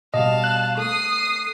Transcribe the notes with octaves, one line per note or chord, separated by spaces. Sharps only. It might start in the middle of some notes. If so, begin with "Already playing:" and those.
B2 G3 D#5 F5 A5
F#6
A3 D#6 C7